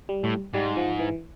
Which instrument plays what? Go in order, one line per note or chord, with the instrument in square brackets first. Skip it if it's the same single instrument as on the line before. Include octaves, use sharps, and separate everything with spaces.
[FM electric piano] G3
[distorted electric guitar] A2
[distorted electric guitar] G#2 [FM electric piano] G3
[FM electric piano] F3
E3